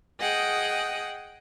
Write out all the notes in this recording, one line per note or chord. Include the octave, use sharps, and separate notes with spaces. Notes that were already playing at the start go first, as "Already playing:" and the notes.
G#4 D#5 F#5 G5